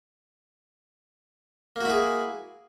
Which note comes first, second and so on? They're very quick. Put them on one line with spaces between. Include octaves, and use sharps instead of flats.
A#3 F#4 E4 G#4